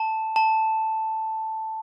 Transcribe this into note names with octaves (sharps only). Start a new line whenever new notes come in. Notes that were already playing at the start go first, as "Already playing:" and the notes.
Already playing: A5
A5